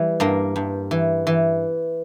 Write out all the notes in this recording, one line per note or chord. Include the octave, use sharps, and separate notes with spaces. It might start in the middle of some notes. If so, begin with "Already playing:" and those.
Already playing: E3 G3
G2 A#3
G2
E3
E3